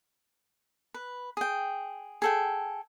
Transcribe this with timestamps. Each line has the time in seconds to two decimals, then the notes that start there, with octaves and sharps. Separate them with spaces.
0.94 B4
1.37 G#4 G5
2.22 G#4 A4 G5